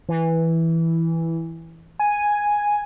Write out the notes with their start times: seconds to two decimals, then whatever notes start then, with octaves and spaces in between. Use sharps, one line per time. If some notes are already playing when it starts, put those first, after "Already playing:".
0.09 E3
1.99 G#5